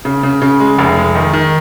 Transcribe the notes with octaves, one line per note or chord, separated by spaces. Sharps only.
C#3
C#3
C#3
G#3
F1
G#3
D#3
D#3